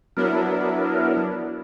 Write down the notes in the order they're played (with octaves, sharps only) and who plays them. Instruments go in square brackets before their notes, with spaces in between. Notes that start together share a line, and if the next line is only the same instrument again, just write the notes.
[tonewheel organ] F#3 A#4 [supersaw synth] B3 D4 E4